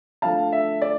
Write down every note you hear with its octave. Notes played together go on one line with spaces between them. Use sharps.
D3 F3 A3 F5 A5
E5
D5